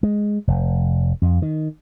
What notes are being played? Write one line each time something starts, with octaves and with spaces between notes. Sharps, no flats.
G#3
F1
F2
D#3